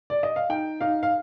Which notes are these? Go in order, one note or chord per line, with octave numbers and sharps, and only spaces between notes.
D5
D#5
F5
D#4 G5
D#4 F5
F5